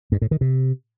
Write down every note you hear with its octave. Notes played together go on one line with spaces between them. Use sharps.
G2
A2
D#3
C3